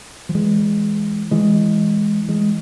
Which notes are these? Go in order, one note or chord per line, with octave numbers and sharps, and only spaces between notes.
F3
E3 G#3
E3 G#3
E3 G#3